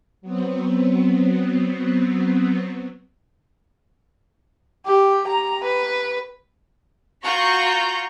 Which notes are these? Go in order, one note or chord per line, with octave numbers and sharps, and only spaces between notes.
F#3 B3 C4
G4
A#5
B4
F4 F#4 A#5 C#6 G6 A#6